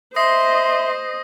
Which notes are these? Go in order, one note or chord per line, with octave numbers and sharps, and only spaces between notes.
C5 D#5 E5 C6 D#6 A#6 C7